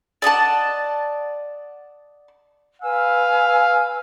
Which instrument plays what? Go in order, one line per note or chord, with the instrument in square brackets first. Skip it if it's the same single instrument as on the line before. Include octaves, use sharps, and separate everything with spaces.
[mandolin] D5 D#5 F#5 A5
[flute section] B4 G#5 E6 [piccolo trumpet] F5